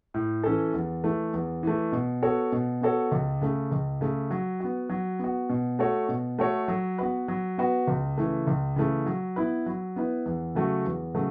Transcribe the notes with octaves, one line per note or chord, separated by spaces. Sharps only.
A2
E3 C#4 A4
E2
E3 A3
E2
E3 A3
B2
B3 F#4 A4 C#5
B2
B3 F#4 A4 C#5
C#2
C#3 A3
C#2
C#3 A3
F#3
B3 F#4
F#3
B3 F#4
B2
A3 F#4 A4 C#5
B2
A3 F#4 A4 C#5
F#3
B3 F#4 B4
F#3
B3 F#4 B4
C#2
C#3 E3 A3
C#2
C#3 E3 A3
F#3
B3 E4 B4
F#3
B3 E4 B4
E2
C#3 F#3 A3 F#4
E2
C#3 F#3 A3